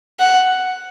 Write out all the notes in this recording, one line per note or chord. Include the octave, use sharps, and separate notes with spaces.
F#5